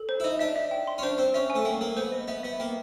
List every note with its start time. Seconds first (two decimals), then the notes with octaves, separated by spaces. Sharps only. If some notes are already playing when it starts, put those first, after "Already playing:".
Already playing: A4
0.09 C5
0.20 E4
0.24 D#4 D#5
0.39 D4 E5
0.56 E5
0.71 G5
0.87 C6
0.98 C#4
1.02 D4 C5
1.18 C4 C5
1.34 C#4 E5
1.50 G#5
1.55 A3
1.65 A#3 G5
1.81 A#3 A4
1.97 B3 C5
2.12 D#5
2.28 B3 E5
2.43 B3 E5
2.60 A#3 G5